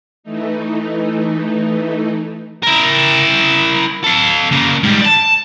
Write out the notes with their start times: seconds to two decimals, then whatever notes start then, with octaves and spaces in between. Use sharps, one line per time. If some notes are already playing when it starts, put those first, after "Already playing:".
0.24 E3 A3 D#4
2.63 E4 A#4
4.04 A4 F5
4.51 C#3 A#3
4.83 G#2 G3
5.01 D5 A5